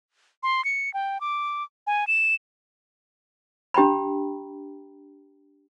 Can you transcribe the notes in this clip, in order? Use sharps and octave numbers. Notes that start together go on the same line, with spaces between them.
C6
C#7
G5
D6
G#5
E7
D4 G4 G5 A#5 B5